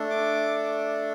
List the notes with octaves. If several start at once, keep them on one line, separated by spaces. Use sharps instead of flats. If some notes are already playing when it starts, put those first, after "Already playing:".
Already playing: A3 D4 A4
D6